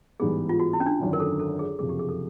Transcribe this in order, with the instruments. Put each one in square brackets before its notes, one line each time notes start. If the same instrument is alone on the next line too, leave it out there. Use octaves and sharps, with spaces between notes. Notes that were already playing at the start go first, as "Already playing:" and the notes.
[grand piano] A1 G#2 E3 G3 B3 [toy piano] G#4
[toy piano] F4
F#4
E4
C#4
D4
[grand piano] G#1 F#2 D3
[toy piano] A#4
A4
A4
G#4
[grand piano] F#1 F2 C3 F3 [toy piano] G#4
[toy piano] G4
G#4
A4